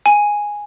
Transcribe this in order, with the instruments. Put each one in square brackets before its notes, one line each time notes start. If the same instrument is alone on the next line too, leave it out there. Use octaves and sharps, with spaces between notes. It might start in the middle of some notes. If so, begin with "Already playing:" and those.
[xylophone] G#5